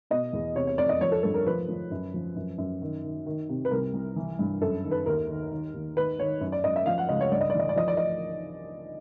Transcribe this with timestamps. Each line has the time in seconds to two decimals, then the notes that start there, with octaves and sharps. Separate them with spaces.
0.11 B2 D#5
0.33 E2
0.55 C3 C#5
0.67 C#5
0.78 F2 D5
0.89 D#5
1.01 F3 C#5
1.12 A4
1.23 G2 A4
1.34 A#4
1.46 F3 B4
1.68 F3
1.91 F#2
2.14 F3
2.36 F#2
2.58 F#2
2.82 D#3
3.04 D#3
3.26 D#3
3.49 C3
3.65 B4
3.71 C2 A#4
3.93 C2
4.16 E3
4.39 G2
4.61 F#2 A4
4.84 D#3
4.91 B4
5.06 D#2 A#4
5.28 D#3
5.51 D#3
5.73 D#2
5.96 D#3 B4
6.19 D#3 C#5
6.41 F#2
6.52 D5
6.64 F#2 D#5
6.76 E5
6.86 F3 F5
6.98 F#5
7.09 C#2 D#5
7.21 C#5
7.31 G2 D5
7.41 D#5
7.50 D5
7.55 E3 D#5
7.69 D5
7.76 F3 D#5
7.88 D5
7.97 D#5